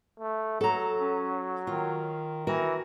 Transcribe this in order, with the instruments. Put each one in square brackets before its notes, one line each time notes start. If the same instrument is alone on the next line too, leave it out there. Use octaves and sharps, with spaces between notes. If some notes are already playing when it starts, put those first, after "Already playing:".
[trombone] A3
[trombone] F#3 [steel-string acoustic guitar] A4 A#5
[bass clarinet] C#4
[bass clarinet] D#3 [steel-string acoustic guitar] F4
[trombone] E3 [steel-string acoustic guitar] F#4 A#4